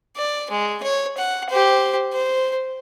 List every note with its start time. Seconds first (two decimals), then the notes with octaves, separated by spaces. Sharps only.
0.17 D5
0.51 G#3
0.83 C#5
1.17 F#5
1.50 G4 C5
2.13 C5